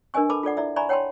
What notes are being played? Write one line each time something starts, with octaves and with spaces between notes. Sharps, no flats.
D4 A#4 B4 D#5 G#5 C#6
A4 B4 A5 B5 D6
F4 A4 D5 F#5
E4 D5 E5
D5 E5 G#5 A#5 B5 C#6
C#5 F#5 G5 A5 B5 C6